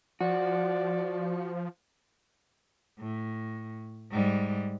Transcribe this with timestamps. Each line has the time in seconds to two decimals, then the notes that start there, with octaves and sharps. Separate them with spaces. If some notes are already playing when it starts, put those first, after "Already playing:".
0.21 F3 F#4 D5
2.99 A2
4.11 G#2 G3